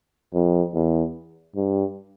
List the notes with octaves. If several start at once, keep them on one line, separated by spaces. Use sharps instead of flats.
F2
E2
G2